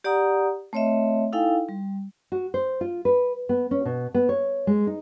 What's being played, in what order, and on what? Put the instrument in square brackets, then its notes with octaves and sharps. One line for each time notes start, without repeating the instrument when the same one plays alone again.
[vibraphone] G4 D5 F#5 A#5 D#6
A3 C4 C#5 D#5 E5
D#4 E4 A4 F5 G5 G#5
G3
[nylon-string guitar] F#4
C5
F4
B4
B3
C#4
B2
B3
C#5
G#3
D#4